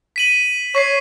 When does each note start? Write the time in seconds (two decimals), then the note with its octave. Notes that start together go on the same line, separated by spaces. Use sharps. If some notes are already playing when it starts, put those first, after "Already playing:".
0.16 B6 D#7 F#7
0.75 C#5 C#6 B6 C7